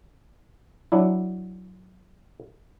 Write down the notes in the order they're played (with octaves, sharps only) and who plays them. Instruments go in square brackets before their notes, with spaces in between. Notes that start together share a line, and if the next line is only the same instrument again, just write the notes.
[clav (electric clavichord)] F#3 D4 E4